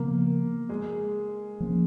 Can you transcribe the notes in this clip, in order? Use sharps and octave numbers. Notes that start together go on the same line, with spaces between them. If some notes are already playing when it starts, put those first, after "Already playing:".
Already playing: C#3 F3 A#3 B3
G#3
F3 A#3 C#4